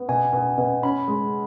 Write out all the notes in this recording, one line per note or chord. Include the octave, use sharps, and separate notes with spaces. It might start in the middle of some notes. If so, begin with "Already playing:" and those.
Already playing: B3
B2 G#5
B2
B2
C#4 B5
G#3